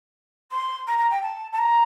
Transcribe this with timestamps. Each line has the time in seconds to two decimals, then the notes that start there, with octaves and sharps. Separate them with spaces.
0.51 C6
0.87 A#5
0.98 A#5
1.10 G5
1.22 A5
1.52 A5
1.58 A#5